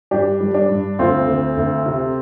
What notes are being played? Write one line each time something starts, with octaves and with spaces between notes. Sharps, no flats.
G2 D4 G4
G3
D4
G2
D2 C4 F4
D2
D2
C3